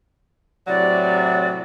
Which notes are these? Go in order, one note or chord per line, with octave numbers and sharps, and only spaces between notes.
A2 C3 F#3 D5